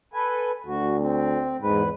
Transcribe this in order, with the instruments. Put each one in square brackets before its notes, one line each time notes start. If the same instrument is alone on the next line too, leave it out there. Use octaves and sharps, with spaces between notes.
[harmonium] A4 B4 G#5
[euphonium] D2 [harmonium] F#4
[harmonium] C4
[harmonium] E2 B4 [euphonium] G#2